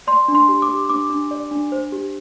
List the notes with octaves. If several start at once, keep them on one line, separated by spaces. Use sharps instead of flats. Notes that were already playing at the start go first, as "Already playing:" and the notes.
D5 C6
D4
C6
G4
D6
G4
D4 D6
D4
D5
D4
C5
G4